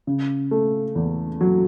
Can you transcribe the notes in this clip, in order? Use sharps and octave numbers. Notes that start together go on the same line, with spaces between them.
C#3
A3
E2
F#3